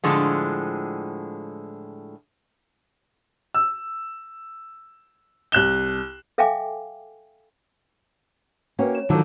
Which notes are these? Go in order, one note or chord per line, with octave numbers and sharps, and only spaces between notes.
A2 D3 F3 G#3
E6
C2 F#6 E7 G7
A4 E5 F5 G5 G#5 D6
A#3 C#4 F#4 B4 G5 G#5
C#5 E7
D3 D#3 F3 F#3 A5 D6 E6